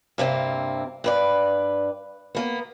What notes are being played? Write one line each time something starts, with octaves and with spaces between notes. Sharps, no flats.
G2 C3 A#3 C4
G2 B4 D5
A#3 B3